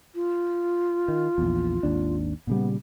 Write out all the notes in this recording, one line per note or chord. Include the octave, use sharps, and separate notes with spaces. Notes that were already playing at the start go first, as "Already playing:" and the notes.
F4
D#3
A#1 E2
G#1 D#2 D4
A#2 C#3 G3 B3